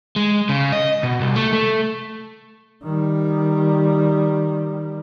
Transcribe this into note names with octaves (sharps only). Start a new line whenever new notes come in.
G#3
C#3
D#5
B2
C2
A3
A3
D#3 G3